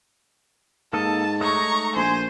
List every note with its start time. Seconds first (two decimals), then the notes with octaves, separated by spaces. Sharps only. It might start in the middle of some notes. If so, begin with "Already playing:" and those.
0.93 G#2 A#3 A4 D#5 A5
1.41 G#3 A3 D#4 C#5 A#5 C#6
1.96 A#1 C5 G#5